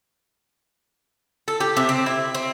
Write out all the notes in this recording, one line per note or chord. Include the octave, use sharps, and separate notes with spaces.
A4
G4
C3
C4
E4
C4